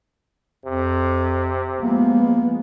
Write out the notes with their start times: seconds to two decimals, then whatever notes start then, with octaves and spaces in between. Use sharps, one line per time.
0.65 F2 C3
1.80 F3 G#3 A#3 B3